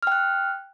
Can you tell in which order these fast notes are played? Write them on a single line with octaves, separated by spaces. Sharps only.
F6 G5 F#6